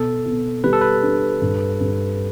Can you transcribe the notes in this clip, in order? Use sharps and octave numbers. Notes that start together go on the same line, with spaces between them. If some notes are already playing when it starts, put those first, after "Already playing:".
Already playing: B2 A4
B2
G3 B4
A4
B4
D4
G2
G2